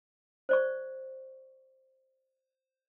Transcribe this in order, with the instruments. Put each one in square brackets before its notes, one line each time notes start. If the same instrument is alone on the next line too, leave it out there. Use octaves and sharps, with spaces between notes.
[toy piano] C5 D5 C#6